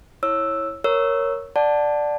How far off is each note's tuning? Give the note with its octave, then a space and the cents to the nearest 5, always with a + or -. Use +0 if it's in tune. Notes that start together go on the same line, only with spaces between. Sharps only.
E4 -10 C#5 -15 E6 +0
A#4 +0 C#5 +0 E6 +0
D5 +5 F#5 +0 A5 +0